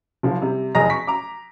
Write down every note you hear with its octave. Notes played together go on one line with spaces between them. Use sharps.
F#1 F3
C3 G3
F1 E2 G#4 D#5 A#5 A#6
C#6 B6
A#5 D6